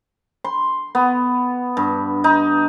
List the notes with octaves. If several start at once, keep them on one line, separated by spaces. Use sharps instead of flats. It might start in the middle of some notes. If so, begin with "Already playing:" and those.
C6
B3
G2
D#4